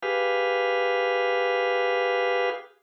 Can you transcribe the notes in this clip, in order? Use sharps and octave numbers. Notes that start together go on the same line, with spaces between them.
G4 G#4 B4 F5